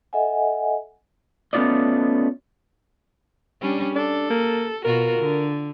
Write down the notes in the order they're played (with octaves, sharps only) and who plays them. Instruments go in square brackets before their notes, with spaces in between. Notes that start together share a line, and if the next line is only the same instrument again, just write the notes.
[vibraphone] A4 D#5 E5 F#5 G#5
[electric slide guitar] A3 B3 C#4 F4 D5 D#5
[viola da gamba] G3 C#4 D4
[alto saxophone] D4 [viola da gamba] A4
[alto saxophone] A#3
[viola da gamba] B2 F4 F#4 [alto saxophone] A#4
[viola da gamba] D3